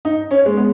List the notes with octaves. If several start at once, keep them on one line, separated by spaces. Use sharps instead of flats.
D#4
C#4
G#3
B3